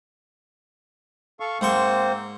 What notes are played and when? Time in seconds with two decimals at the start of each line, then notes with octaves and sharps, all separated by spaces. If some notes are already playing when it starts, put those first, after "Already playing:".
1.40 A4 F5 C#6
1.61 G#2 A#3 C4 C5 C6 C#6